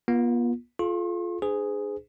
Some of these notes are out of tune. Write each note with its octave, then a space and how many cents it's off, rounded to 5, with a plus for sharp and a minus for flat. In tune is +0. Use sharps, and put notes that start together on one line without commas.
B3 -45 F4 +0
F4 +0 A4 -40 C6 +45
D4 +30 G#4 +0 C5 -40